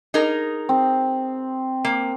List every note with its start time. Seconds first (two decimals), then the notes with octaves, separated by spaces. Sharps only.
0.14 D#4 G#4 A#4
0.69 C4
1.85 A#3